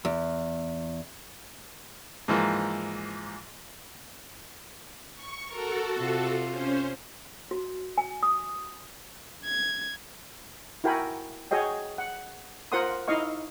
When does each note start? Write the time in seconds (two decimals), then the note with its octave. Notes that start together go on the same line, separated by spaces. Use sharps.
0.05 E2
2.28 G#2 E3 F3 A#3
5.15 C#6
5.51 F#4 A4 A#4
5.99 C3 F4
6.48 C#4 C5
7.51 F#4
7.98 G#5
8.23 D#6
9.45 G#6
10.84 E4 F#4 A#4 G5 G#5 B5
11.51 F#4 G#4 C#5 D#5 G5
11.98 F#5
12.72 F4 A#4 C5 F#5 C6 D#6
13.08 D#4 E4 D#5 F5 C#6